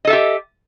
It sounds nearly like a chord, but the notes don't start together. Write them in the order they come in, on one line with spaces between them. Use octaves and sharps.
D#5 A4 E5 G4